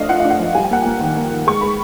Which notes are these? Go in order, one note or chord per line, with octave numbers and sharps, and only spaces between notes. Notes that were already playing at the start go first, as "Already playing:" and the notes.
Already playing: F3 A3 D4 D#5 F5
F4 F#5
D4 F5
F#5
F3
G3 G#5
G5
A#3 F#5
A#3 G5
D#3
A#3
D#3
G#3 C#6
G#3 B5